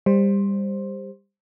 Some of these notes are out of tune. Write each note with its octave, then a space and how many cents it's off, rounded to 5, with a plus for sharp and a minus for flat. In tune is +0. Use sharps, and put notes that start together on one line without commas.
G3 +20 C5 +10